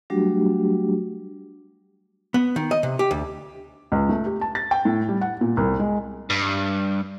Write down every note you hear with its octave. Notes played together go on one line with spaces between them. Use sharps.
F#3 G3 A3 D4 F#4 G4
B3
D#3
D#5
C3
G4
D2
C#2
A3
G4
A5
A6
G5
A2
G3
F#5
A#2
C2
G#3
G2